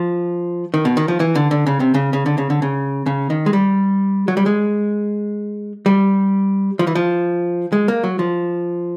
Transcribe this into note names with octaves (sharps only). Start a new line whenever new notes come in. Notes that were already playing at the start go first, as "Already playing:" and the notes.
Already playing: F3
D#3
B2
D#3
F3
E3
D3
D3
C#3
C3
C#3
C#3
D3
C#3
D3
C#3
C#3
D#3
G#3
G3
F#3
G3
G#3
G3
F3
E3
F3
G#3
A#3
F#3
F3